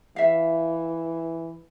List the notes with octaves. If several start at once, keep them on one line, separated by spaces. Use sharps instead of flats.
E3 E5 F5